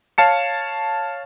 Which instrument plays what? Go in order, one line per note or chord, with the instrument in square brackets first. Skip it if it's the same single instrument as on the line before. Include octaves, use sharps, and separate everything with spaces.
[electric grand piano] C#5 F5 A5 C#7